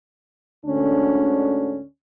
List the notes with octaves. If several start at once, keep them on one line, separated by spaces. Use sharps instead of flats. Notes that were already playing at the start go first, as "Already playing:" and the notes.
D2 G#2 D3 C#4 D4